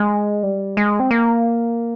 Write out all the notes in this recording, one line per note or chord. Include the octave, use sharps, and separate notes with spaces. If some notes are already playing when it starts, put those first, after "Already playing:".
Already playing: G#3
G3
G#3
C4
A#3